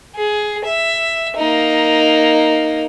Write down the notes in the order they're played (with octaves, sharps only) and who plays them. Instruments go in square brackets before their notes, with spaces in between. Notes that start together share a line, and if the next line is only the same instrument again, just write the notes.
[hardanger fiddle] G#4
E5
A#3 D#4